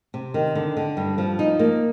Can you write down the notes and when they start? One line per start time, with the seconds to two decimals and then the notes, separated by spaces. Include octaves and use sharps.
0.14 C3
0.34 D#3
0.55 D3
0.77 D3
0.97 G2
1.18 F3
1.39 D#4
1.59 A#3